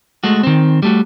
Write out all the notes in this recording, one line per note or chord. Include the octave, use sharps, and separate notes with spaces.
G#3 A3 F#4
D#3 C4
G3 A3 F#4